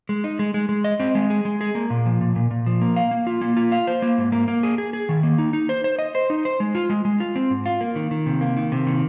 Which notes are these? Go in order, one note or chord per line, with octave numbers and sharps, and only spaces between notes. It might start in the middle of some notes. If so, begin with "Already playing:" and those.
G#3
D#4
G#3
G#3
G#3
D#5
C4
G#3
G#4
G#3
G#4
A#3
A#2
F3
A#2
A#2
A#2
F3
A#3
F5
A#3
F4
A#3
F4
F5
C5
A#3
G#2
A#3
A#3
G#4
G#4
G#4
D#3
A#3
D#4
D#4
C5
C5
D#5
C5
D#4
C5
G#3
F4
G#3
G#3
F4
C4
G#2
F4
A#3
D#3
D#3
C3
A#3
D#3
C3
D#3